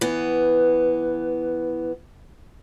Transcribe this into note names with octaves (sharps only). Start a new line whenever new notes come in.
E3 B3